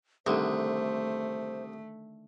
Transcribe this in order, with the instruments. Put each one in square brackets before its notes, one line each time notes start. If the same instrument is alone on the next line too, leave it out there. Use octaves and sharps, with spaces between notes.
[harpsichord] C2 [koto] D3 D#3 [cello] A3 [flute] C5